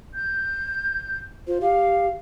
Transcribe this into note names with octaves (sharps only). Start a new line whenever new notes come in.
G6
F4 C5
G4 F5